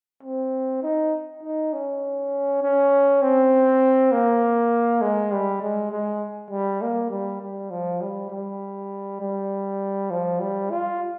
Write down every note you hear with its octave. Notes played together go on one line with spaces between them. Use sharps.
C4
D#4
D#4
C#4
C#4
C4
A#3
G#3
G3
G#3
G#3
G3
A#3
G3
G3
F3
G3
G3
G3
F3
G3
F4